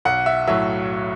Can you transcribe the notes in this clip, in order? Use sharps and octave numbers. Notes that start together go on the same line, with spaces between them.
B1 F#5
E5
A2 F#3 E5